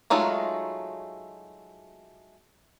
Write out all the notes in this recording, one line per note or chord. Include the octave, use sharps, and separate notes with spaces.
F#3 G#3 A3 D#4 F4